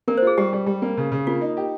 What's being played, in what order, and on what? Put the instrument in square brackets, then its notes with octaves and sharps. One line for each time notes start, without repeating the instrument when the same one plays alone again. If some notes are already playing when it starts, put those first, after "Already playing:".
[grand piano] A#3 [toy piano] A#4
[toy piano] C5
[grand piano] F4 [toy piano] G#4
[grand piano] G3 [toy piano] G4
[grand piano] G3
G3
A#3
C#3
C#3
[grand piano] A#3 [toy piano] F4
[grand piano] D#4
G4